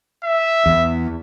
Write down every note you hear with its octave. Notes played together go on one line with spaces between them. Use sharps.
E5
E2